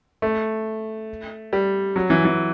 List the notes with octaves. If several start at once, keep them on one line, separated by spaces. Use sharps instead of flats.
A3
G3
F#3
E3
E3